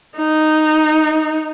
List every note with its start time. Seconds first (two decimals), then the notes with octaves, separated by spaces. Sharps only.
0.17 D#4